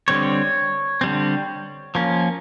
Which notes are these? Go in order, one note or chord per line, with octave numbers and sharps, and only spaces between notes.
D3 G3 C4 C#5
D3 G3 C4
F3 A#3 C#4